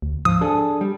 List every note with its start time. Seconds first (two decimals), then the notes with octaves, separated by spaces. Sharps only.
0.02 D2
0.25 G#2 F3 D#6
0.41 D4 G#4 A4
0.81 G3